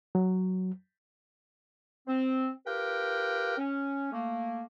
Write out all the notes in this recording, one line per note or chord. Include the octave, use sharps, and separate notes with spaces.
F#3
C4
F4 G4 A#4 B4 G5
C#4
A3 A#3